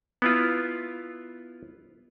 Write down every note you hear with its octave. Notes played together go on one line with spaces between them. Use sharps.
B3 E4 F4